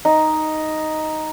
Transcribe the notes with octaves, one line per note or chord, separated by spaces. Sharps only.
D#4